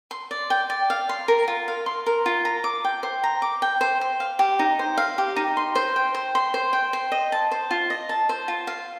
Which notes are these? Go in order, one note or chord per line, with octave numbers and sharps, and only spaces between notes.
C6
D5
G5
D5
F5
C6
A#4
F4
F5
C6
A#4
F4
A#5
D6
G5
C5
A#5
D6
G5
C5
C5
F5
G4
D#4
C5
F5
G4
D#4
C6
C5
G5
C5
C6
C5
G5
C5
D#5
A5
C5
F4
D#5
A5
C5
F4
F5